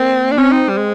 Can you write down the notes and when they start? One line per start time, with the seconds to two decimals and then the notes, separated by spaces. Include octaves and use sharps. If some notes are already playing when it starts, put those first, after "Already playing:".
Already playing: A#3 C4
0.31 D4
0.38 C4 C#4
0.52 D#4
0.69 G3
0.77 G#3